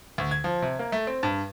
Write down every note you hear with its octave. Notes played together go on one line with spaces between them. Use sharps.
D2
G#6
F3
C3
A#3
A3
C4
G2